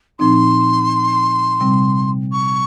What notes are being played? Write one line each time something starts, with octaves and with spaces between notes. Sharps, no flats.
A#2 F3 C4 D#4 C6
C3 G3 C4
C#6